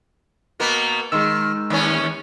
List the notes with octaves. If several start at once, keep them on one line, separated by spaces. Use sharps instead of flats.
B2 A#3 B3
D#3 G#3 C6 E6
D#2 B3 C#4